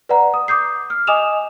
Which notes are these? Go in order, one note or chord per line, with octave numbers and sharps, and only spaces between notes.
B4 D5 F#5 A#5
D#6
D6 D#6 G6 C7
F6
D#5 G#5 D6 D#6 E7 F7